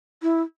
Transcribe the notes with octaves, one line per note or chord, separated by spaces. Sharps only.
E4